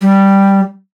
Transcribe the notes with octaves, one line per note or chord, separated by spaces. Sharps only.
G3